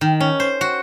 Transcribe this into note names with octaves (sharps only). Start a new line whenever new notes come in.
D#3
C#4
C5
F#4